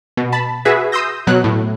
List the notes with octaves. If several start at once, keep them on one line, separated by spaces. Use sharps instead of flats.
B2
A5 B5
F#4 G#4 B4 E5
C6 D#6 E6 G6 A#6
B2 F#3 F#6
A2